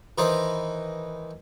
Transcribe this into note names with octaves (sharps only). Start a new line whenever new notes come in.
D#3 E3 D#4 B4 C5